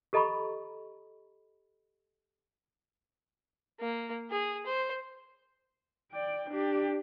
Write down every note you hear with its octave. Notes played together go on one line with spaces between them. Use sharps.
G4 A4 D#5 A#5 B5 C#6
A#3
G#4
C5
D5 G5
D4 G4